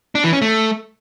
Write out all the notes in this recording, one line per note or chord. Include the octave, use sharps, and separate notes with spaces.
D4
E3
C#4
A3